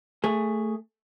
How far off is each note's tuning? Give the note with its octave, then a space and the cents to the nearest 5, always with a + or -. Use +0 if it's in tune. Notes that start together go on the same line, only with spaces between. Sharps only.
A3 +10 G#4 -5